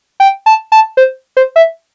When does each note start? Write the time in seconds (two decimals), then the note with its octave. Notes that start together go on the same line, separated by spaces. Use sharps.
0.20 G5
0.46 A5
0.72 A5
0.97 C5
1.37 C5
1.56 E5